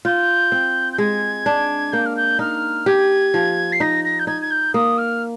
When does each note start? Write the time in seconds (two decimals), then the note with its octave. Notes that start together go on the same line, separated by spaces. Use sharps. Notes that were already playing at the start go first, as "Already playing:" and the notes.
0.05 F4 G6
0.52 C4
0.92 G6
0.98 G#3 G#6
1.46 D4
1.92 A#3 G6
2.05 F6
2.16 G6
2.39 D#4 F6
2.86 G4 G#6
3.34 F3
3.72 C7
3.80 D#4 A#6
4.04 A#6
4.19 G6
4.27 D#4 G#6
4.41 G#6
4.50 G6
4.73 A#3 D#6
4.97 F6